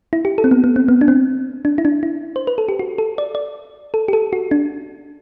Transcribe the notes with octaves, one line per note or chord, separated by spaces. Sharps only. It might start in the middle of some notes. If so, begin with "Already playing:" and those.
E4
G4
A4
C4
B3
B3
C4
B3
D4
C4
D4
E4
D4
E4
C5
B4
A4
G4
F#4
A4
D5
D5
A4
G4
A4
F#4
D4